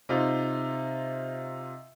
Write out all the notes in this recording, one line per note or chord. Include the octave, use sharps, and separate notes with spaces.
C3 D#4 F4